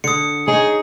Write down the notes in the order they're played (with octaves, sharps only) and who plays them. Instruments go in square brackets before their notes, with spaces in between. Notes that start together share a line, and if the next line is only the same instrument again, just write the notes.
[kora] D3 [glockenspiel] D#6 C#7
[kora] D#4 C#5 G5 [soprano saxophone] G#4